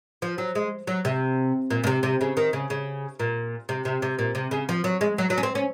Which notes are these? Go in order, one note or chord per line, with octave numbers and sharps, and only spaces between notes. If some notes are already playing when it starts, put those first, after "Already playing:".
F3
F#3
G#3
F#3
C3
A#2
A#2
C3
C3
C#3
D#3
C#3
C#3
A#2
C3
C3
C3
A#2
C3
C#3
F3
F#3
G#3
F#3
F#3
C#4
C4
C#4